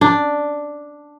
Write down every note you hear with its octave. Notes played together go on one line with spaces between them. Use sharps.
D4